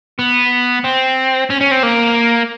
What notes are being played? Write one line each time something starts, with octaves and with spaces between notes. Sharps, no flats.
B3
C4
C#4
C#4
C4
A#3